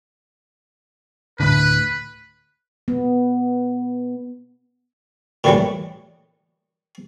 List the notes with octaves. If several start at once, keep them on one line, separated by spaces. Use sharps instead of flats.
D2 A2 D3 B4
B3
A#2 D#3 E3 F#3 G3 A3